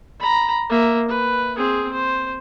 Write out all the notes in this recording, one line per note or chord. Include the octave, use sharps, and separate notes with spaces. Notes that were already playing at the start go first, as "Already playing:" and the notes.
A#5 B5
A#3 E5
B4
C4 G#4
C5